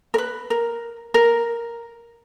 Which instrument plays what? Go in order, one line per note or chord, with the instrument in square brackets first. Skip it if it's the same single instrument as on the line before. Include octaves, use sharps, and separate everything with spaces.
[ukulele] A#4
B4
A#4
A#4